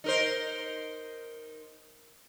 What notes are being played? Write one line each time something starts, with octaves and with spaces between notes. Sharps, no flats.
D#4 A#4 C5